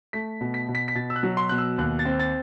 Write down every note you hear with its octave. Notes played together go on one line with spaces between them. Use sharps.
A3 B6
B2
B6
B2
B6
B6
B2 A6
E6
F#6
F#3
C6
B2 F#6
E6
D#2 F#6
A6
C4
A6